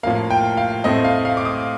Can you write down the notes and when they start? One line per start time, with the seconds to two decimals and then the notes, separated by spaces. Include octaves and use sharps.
0.03 A2 F3 A#3 F5
0.30 G5
0.57 F5
0.84 A2 A3 C4 D#5
1.04 F5
1.25 F5
1.37 D6
1.45 D#6